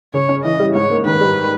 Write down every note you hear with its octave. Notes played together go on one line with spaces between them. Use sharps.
C#3 C#5
C#4
E3 D#5
G3
G#2 C#5
A#3
D#3 B4
G3